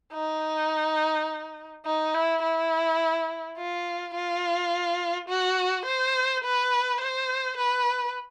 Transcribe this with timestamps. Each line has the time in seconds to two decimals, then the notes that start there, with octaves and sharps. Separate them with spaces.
0.14 D#4
1.86 D#4
2.14 E4
2.43 E4
3.58 F4
4.15 F4
5.29 F#4
5.86 C5
6.44 B4
7.01 C5
7.58 B4